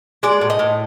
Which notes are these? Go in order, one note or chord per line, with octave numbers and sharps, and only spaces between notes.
G#3 D5
A2
D#5
A2